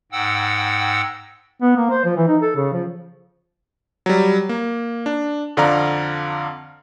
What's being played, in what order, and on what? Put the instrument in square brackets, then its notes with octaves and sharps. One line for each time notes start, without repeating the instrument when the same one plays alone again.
[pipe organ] G#2 F#5 G5 E6
[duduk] B3
A#3
C5
F3
E3
D#4
A4
C#3
F3
[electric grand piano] F#3 G3
A#3
D4
F2 D3 D5 F5 A#5 F6